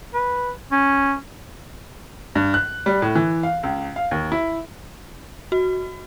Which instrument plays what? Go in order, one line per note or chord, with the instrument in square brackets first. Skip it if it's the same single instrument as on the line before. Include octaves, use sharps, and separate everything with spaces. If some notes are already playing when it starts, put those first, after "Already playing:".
[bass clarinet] B4
C#4
[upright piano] G2
F#6
G3
A2
E3
F5
C#2
F5
D#2
E4
[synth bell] F#4